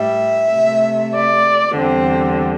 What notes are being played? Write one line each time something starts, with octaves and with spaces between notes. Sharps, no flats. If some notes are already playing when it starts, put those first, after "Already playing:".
Already playing: A2 G3 E5
C3 A3
D5
E2 D3 G3 C4